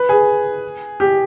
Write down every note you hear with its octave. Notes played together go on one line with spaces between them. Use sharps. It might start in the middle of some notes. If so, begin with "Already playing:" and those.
Already playing: B4
G#4
G4